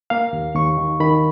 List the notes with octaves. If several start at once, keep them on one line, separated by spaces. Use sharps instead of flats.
A#3 F5
D#2
D#2 C#6
D#3
D#3 B5